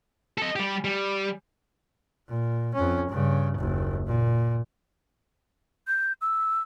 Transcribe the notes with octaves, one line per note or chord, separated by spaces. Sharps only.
A4 D#5
G3 G4
G3
A#2
F2 C#4
G2 C#3
F#1 D#2
A#2
G6
E6